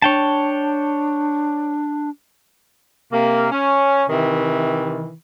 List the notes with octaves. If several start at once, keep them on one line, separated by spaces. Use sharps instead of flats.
D4 C#5 G5 A5
C3 A#3
C#4
C3 D#3 E3